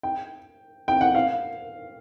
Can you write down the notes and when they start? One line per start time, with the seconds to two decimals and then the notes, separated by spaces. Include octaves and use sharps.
0.03 G5
0.88 G5
1.01 F#5
1.15 F5